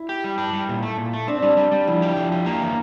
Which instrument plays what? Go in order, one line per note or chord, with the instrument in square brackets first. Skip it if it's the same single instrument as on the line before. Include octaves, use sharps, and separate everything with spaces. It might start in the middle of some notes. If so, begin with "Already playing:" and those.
Already playing: [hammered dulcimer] E4
[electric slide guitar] G4
G3
D4
G3
A#2
A3
A#2
A3
[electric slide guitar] C4 [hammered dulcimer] D4
[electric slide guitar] G3
G3
G3
[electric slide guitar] F3 [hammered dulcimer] E4
[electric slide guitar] G4
F3
G4
A#3
E3